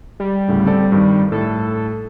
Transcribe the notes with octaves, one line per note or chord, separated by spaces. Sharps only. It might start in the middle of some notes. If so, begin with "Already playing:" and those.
G3
D2 A2 C#3
C4 A4 D5
G2 D#3
A2 A4